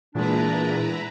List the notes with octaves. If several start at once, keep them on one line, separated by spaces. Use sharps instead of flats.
E2 A#2 E3 G#3 D4 E4 B4 A#5